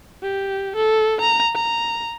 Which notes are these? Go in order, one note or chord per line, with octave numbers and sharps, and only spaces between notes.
G4
A4
A#5
A#5